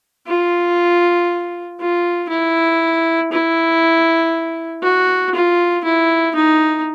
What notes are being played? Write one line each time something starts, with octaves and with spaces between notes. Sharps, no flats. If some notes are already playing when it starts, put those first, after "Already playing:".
F4
F4
E4
E4
F#4
F4
E4
D#4